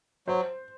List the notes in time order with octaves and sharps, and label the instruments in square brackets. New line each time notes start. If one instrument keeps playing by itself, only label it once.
[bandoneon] F#3 [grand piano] C5